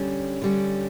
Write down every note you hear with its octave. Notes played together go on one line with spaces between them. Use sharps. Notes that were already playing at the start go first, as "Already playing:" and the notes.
Already playing: D3 G3 C#4
D3 G3 C#4